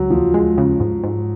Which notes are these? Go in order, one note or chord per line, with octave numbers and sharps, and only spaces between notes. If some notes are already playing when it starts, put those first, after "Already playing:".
Already playing: C#2 F#3
D#2 F3
G#3
C#3
G#2
G#2